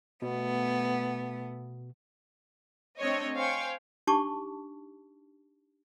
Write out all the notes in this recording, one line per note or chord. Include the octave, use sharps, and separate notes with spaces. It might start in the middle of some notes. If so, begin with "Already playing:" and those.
B2 A3 B3
A3 C4 D4 C#5 D#5
C5 C#5 F5 G5 G#5 C#6
D4 D#4 G4 A5 C#6 D6